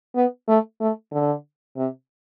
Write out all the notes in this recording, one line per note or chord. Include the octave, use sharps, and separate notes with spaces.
B3
A3
A3
D3
C3